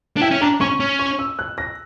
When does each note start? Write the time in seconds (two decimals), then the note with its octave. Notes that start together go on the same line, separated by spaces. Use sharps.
0.16 D4
0.21 E4 G5
0.31 C#4
0.41 D4 A#5
0.61 C#4 C#6
0.80 C#4
0.99 C#6
1.19 E6
1.39 F#6
1.58 A#6